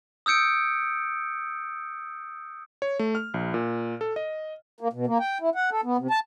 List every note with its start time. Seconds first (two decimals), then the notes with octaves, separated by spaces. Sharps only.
0.26 D#6 E6 G6 C#7 D7
2.82 C#5
2.99 A3
3.15 F6
3.34 A#1
3.54 A#2
4.01 A4
4.16 D#5
4.81 A#3
4.93 B2
5.07 A#3
5.20 G5
5.41 E4
5.55 F#5
5.71 A4
5.84 B3
5.98 C3
6.11 A5